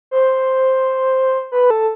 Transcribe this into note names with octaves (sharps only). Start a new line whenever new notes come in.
C5
B4
A4